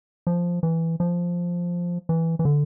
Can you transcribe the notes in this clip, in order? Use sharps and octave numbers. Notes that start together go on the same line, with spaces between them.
F3
E3
F3
E3
E3
D3